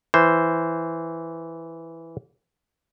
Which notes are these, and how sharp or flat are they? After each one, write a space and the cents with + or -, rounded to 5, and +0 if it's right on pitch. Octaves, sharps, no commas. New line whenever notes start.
E3 +0 C5 +0